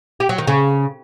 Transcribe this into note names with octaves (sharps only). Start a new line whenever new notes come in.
G4
F#3
D#3
C#3